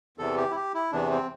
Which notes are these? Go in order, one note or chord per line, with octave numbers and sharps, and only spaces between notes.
E2 C3 E3 A4
G4
E4
G4
E4
E2 C3 E3 D4
C4